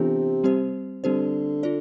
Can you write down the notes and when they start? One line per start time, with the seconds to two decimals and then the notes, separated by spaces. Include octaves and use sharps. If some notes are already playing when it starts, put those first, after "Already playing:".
Already playing: C3 E3 B3 D4 F4 A4
0.44 G3 C4 G4 C5
1.04 D3 G3 C4 G4 C5
1.63 F4 A4 D5